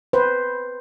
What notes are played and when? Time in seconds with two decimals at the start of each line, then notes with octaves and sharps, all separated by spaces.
0.13 B4 C5